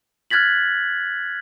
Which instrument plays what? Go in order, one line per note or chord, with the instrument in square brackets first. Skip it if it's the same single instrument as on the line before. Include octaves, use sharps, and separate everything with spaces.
[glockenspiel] F6 F#6 G#6 A6 B6 F#7